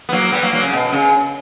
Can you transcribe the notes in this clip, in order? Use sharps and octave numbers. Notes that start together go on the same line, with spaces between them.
B3
F#3 A#3
G3 B3
F#3 A#3
F#3 A#3
C#3
B2
C#3